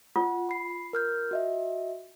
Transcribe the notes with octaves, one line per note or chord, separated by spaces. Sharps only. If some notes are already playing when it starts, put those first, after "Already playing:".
F4 F#5
B5 C7
A#4 F6 G6
F#4 D#5 E5